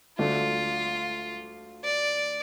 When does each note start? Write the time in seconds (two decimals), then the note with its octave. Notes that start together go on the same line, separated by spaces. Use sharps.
0.18 D2 D3 A3 D4 F4
1.84 D5